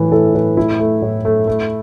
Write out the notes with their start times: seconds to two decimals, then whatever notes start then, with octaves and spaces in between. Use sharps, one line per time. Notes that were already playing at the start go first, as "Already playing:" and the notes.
Already playing: A2 E3 B4
0.12 A2 A4
0.34 A2 B4
0.57 A3 E4
0.79 A3
1.02 A2
1.25 A3
1.47 A3